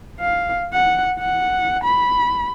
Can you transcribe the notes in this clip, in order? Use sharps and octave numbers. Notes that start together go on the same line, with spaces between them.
F5
F#5
F#5
B5